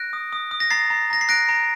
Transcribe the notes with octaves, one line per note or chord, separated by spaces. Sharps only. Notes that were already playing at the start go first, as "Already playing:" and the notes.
Already playing: F#6 A#6 D7
D#6
D#6
D#6
A#6
A#5 A6 C7
A#5
A#5 A#6
C7
F#6 A#6 D7
A#5